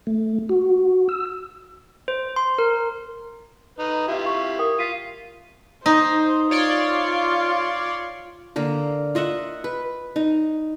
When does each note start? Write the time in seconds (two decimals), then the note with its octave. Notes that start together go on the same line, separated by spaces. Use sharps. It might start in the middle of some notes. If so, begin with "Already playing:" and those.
0.07 A3
0.49 F#4
1.09 E6
2.08 C5
2.36 C6
2.58 A#4
3.79 D#4 B4
4.08 E4 F4 G4
4.26 C#6
4.59 A#4 G5 D#6
4.79 F4 B6 C7 D#7
5.86 D#4 C5
6.51 F4 C#5 D5 C6
8.56 D3 A#3 A#4
9.15 F4 D#5 E5 F#5
9.64 B4
10.16 D#4